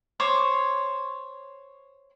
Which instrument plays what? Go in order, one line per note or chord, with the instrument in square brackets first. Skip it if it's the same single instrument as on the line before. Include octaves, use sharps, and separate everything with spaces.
[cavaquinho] C5 C#5 D6